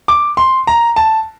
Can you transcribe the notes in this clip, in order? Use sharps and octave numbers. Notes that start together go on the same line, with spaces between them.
D6
C6
A#5
A5